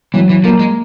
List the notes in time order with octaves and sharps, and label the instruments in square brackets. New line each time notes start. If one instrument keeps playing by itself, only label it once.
[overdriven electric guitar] E3 [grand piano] F#3
[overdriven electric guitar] E3
[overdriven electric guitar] F3 [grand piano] A#3
[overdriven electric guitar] G#3